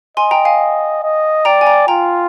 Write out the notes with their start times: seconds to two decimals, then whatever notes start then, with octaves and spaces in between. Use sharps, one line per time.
0.17 D#5 G#5 C6
0.31 G5 A#5
0.45 F5 G#5
1.03 D#5
1.45 D5 G5 A#5
1.61 G#5
1.67 G5 A#5
1.88 F4 G5 A#5